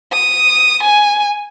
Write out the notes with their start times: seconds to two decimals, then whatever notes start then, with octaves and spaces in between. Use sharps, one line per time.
0.12 D#6
0.83 G#5